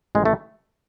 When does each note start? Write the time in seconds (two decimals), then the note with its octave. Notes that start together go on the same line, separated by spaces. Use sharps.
0.15 A1 G#3
0.25 A3